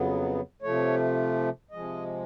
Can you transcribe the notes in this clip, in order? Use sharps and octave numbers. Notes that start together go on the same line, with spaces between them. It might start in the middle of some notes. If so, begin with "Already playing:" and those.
Already playing: F2 C#3 F#3 B3
C3 F3 A3 C#5
C3 F3 G#3 D#5